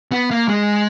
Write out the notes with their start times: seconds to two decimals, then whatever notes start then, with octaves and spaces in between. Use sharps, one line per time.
0.12 B3
0.31 A#3
0.48 G#3